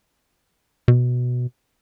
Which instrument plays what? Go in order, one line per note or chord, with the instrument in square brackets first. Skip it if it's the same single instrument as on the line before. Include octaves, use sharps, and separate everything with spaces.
[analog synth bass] B2